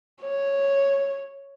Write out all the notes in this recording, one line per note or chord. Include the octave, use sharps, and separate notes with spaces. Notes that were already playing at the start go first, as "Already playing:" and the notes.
C#5